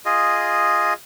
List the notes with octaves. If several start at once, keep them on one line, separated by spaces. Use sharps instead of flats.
F4 G#4 D#5